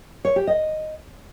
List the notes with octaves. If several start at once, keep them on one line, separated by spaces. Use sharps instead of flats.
C#5
G4
D#5